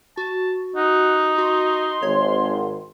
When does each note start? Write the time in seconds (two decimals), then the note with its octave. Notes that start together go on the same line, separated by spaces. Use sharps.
0.17 F#4 A5
0.76 D#4 F#5
1.38 F#4 C6
2.02 G#1 C#5